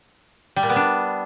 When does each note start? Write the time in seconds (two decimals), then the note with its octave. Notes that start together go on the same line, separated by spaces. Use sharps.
0.56 G3
0.63 A#2
0.70 B3
0.76 D4